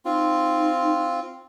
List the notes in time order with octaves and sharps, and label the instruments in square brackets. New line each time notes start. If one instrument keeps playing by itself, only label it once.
[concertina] C4 F4 [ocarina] D#4